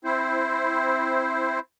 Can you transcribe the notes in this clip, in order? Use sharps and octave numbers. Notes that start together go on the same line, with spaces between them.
C4 E4 C5